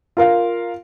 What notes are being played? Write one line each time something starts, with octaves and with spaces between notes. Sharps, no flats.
F4 A#4 F5